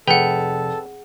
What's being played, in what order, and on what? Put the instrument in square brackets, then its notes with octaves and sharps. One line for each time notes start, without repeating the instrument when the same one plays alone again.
[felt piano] F1 [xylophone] G#4 F#5 [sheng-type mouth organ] A4 [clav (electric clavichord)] B4 G5